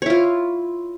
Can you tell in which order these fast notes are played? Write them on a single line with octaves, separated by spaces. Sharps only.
C#5 E4 F4